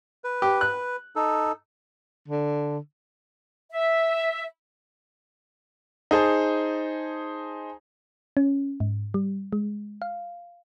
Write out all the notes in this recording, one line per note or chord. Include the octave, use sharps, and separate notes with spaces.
B4
G4
F#6
D#4 A4
D3
E5
D#4 G#4 C5 A5
C#4
G#2
G3
G#3
F5